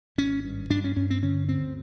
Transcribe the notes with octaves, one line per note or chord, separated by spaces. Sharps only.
G#1 C#4
G2
G2 D4
C#4
G2 C#4
C4
D3 C#4
D2 C4